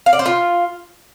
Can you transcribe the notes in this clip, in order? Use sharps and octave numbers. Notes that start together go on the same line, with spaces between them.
F5
D5
C5
F4